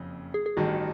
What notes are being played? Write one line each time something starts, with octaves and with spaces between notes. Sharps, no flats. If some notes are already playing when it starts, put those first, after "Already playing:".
Already playing: F#1 F2 C#3
G#4
G#4
A1 G2 D#3 F#4